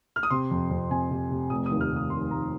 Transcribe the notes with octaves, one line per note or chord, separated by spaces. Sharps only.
F6
D#6
C3 C6
F2
F2
C3 G#5
C3
C3
F1 D#6
D#6
D#2
F6
F1
D#6
F1 C6
F1 A#5